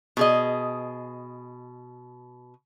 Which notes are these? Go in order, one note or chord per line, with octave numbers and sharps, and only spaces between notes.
B2 G#4 D#5